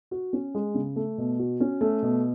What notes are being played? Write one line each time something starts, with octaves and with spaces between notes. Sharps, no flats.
F#4
C#4
G#3
C#3
A3
B2
F#4
C#4
A3
B2